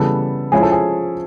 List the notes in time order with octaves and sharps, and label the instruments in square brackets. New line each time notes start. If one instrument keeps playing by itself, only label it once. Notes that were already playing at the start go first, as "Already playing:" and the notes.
Already playing: [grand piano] C#3 E3 G3 B3 A4
F3 G#3 C#4 E4 G#4
A4
G#4